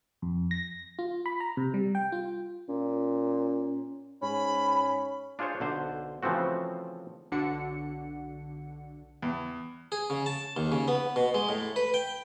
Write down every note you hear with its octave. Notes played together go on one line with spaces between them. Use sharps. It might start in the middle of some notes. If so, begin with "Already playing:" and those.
F2
A#6
F4
B5
A#5
C3
G3
G5
F4
A#2 C#4
G#2 C#4 B5
D4 F4 G#4 C5 C#5
B1 D3 C5
C#3 E3 F3 A3 C4 F#4
B1 D3 D4 F#4 F#5 C#7
E2
G#4
C#3
A5
D#2
C#3
B3
B2
G#3
A2
B4
G5